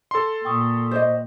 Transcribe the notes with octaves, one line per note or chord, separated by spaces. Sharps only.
A4 C6
A#2 G5 C#6 D#6
C5 D5 D#5